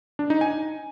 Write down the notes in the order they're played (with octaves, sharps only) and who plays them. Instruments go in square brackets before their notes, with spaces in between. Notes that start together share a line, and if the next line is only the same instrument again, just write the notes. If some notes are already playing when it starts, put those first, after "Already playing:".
[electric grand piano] D4
D#4
G#5